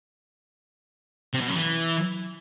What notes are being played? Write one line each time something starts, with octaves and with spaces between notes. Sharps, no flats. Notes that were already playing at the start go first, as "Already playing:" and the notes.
C3
B2
F#2
E3